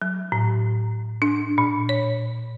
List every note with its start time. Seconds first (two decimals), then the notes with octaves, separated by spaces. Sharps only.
0.02 F#3
0.32 A2
1.22 D4
1.58 A#2
1.89 C#5